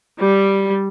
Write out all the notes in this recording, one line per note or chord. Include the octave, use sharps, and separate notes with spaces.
G3